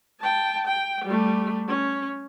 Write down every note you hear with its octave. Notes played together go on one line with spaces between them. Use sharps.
G5 A5
G5
G3 A3
C#4